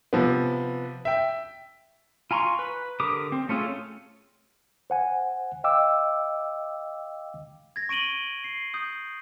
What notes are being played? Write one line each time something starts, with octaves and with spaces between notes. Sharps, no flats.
C3 F3 B3
E5 G5
F4 G#5 A#5 C6 C#6
B4
D3 G4 A#4 D6 D#6
C4
A3 C#4 F4 G#4 A4
C5 F#5 G#5
D#5 F5 G5 D6 E6
G#6 A#6
C#6 D7 D#7 F#7 G7
C7
D#6 G6